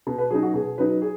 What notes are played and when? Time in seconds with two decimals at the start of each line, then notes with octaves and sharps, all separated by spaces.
0.07 B2
0.18 B4
0.30 F#3 D#4 G#4
0.42 F#4
0.54 B2 G#4
0.78 F#3 D#4 B4
1.02 G#4